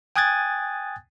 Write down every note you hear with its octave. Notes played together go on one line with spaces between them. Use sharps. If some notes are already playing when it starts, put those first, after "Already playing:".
G5 G#5 D#6 F#6 G#6 A6